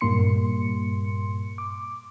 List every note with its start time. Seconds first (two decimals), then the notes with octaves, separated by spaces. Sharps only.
0.01 G2 A#2 G3 A#3 C6 C#7
1.58 D6